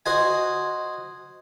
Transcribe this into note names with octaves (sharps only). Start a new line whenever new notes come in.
F#4 C5 D#5 G#5